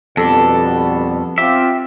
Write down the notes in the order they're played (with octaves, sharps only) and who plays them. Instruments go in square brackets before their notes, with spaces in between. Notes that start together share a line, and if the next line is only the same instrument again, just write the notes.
[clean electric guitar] F2 [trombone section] B2 G3 B3 [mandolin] D4 A4
[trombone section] C4 F4 [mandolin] G4 [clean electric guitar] E5